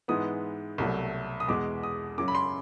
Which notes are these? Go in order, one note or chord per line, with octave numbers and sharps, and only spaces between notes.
G#2 E3 G#3 B3 D#6
C2 B2 F#3 A3
D#6
E2 B2 G#3 D6
D#6
F#2 C#3 F#3 D6
B5
C6